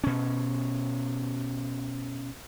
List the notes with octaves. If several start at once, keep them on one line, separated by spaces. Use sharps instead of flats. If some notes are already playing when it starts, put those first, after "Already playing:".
B2 C#4